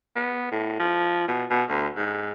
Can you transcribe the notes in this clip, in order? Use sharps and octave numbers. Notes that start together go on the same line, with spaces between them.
B3
A2
F3
B2
B2
D2
G#2